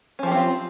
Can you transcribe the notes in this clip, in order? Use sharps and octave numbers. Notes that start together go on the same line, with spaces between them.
F3 C4 C#4 F4 G4